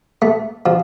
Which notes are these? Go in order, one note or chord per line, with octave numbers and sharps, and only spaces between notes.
A3
F3